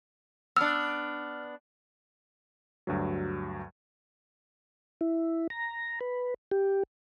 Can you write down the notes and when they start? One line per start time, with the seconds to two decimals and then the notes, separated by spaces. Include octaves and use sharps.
0.56 B3 D4 E6 F6
2.87 D2 G2 F#3
5.01 E4
5.50 A#5
6.01 B4
6.51 G4